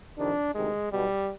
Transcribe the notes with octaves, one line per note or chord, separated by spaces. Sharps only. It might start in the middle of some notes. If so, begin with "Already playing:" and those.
F2 C3 D#3 D4
D2 C3 D#3 G#3
B1 B2 G3